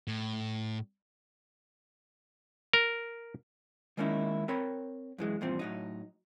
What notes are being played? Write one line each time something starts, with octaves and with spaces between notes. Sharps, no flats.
A2
A#4
D#3 G#3 A#3 C#4 D#4 E4
C4 A#4 C#5 B5
F#2 E3 G#3
E2 G2 A#2 F3 C4
A2 F#3 D#4